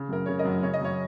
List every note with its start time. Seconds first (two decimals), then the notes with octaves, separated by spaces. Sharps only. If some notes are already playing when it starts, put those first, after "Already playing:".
Already playing: C#3
0.09 F#2 A#4
0.26 C#3 C#5
0.39 A#4 D#5
0.45 F#2
0.63 C#3 C#5
0.74 D#5
0.81 F#2 C#5